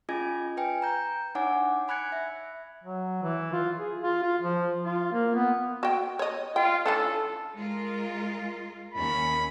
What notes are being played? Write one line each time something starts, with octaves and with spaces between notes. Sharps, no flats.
C#4 F4 G#4 D#5 G#5 G#6
B4 G5 G#5
A#5 G6
D4 D#4 C#5 F#5 G#5 D6
G#5 B5 F#6 G#6 C#7
E5
F#3
E3
F4
G#4
F4
F4
F3
F4
A#3
B3
F#4 G5
C#5 D#5
F4 G5
E3 C#4 D4 A4
G#3 F4 A#4
D#2 C#4 B5